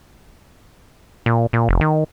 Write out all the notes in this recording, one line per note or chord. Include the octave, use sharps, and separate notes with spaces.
A#2
A#2
F1
D#3